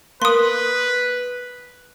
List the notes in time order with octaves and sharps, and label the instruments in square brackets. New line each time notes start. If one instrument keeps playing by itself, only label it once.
[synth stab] A#3 [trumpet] B4 [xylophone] C6 D#6